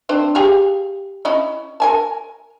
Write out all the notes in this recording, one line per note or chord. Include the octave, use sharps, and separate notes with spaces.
C4 D4 C5
G4 G#4 F5
C#4 E4 D#5
A#4 G#5 A5